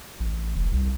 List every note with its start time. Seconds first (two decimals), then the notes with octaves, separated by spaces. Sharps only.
0.20 A1
0.56 F1
0.72 C2